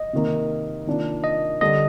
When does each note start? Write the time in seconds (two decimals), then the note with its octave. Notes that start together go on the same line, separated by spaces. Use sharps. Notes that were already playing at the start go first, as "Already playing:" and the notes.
Already playing: D#5
0.13 C3 D#3 A#3
0.87 C3 D#3 A#3 D4 F4
1.24 D#5
1.61 D3 G3 D4 D#5